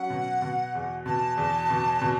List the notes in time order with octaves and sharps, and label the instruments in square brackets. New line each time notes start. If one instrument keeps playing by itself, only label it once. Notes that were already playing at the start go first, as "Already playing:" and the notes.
Already playing: [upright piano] F#3 C#4 [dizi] F#5
[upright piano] B2
B2
E2
[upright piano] B2 [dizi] A5
[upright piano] E2
B2
B2